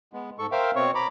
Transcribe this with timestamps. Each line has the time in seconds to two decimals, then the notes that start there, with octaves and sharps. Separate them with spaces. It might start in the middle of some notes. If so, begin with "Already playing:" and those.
0.13 G#3 B3
0.39 G#2 A4 C#6
0.52 A#4 C5 E5 F5 G5
0.76 B2 C4 C#5 C#6
0.95 A#5 B5 D6